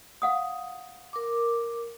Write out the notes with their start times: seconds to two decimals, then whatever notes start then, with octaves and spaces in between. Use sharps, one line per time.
0.22 F5 F#5 D#6
1.13 A#4 D6